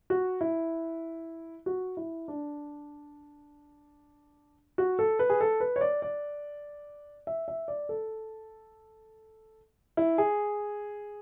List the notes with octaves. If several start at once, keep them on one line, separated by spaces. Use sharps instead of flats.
F#4
E4
F#4
E4
D4
F#4
A4
B4
G#4
A4
B4
C#5
D5
D5
E5
E5
D5
A4
E4
G#4